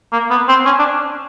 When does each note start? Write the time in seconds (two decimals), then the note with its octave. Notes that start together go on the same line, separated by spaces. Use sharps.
0.13 A#3
0.31 B3
0.49 C4
0.66 C#4
0.79 D4